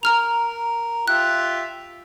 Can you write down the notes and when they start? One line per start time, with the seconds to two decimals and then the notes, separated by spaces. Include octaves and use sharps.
0.03 A#4 A#5 F6 F7
1.08 F4 G4 E5 F#6